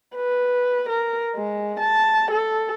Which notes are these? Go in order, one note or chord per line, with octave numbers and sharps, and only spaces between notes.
B4
A#4
G#3
A5
A4